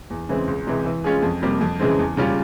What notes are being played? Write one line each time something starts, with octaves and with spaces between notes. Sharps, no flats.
E2
C#3 E3 G#3 C4
C#2
C3 E3 G#3
E3
G#3 C#4 F4 G#4
F2
C3 G3 A#3
F2
C#3 E3 G#3 C4
E2
C#3 G3 C#4 F4